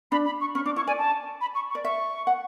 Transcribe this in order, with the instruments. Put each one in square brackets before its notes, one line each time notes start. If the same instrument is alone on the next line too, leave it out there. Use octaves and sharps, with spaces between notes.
[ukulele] D4 [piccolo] B5
[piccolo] B5
C#6
[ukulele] C#4 [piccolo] C#6
[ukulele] D4 [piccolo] D6
[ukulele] E4 [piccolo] C#6
[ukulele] D5 [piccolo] G#5
[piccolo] A5
B5
C#6
C#6
[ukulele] D5
[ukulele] E5 [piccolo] C#6
[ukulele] F#5